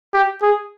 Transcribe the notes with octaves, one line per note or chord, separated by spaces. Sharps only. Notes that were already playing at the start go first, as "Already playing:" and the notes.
G4
G#4